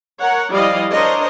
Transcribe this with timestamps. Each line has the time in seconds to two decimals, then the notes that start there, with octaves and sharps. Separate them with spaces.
0.18 A#4 C#5 F#5
0.50 F3 G3 E4 D5 D#5 F5
0.90 D4 A#4 C5 C#5 D#5